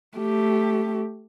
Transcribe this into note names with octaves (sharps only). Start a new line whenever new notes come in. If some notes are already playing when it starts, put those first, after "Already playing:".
A3 G4